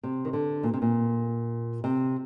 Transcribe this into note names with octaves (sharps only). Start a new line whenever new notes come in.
C3
D#3
D3
A#2
C3
A#2
C3